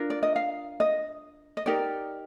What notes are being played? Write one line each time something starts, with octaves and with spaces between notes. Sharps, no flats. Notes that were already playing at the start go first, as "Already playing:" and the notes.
Already playing: D4 F4 A#4
D5
D#5
F5
D#5
D#5
D#4 G4 A#4 D5